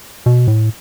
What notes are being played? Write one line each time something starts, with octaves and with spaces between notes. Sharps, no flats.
B2
A2